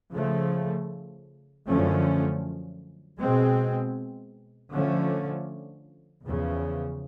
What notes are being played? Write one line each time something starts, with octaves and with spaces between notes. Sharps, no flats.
C#3 F3 A3
F#2 D3 F3 A3 C#4
B2 G#3 C4
D3 F3 A3 C#4
E2 C#3 F3